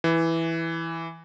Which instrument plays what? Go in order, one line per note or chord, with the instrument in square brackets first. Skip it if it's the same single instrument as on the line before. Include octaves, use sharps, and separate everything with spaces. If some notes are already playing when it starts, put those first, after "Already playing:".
[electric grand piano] E3